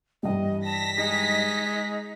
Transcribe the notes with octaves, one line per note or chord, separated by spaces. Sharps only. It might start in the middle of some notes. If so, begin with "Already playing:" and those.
G2 E3 G3 D#5
A5 A#6 B6
G#3 D#4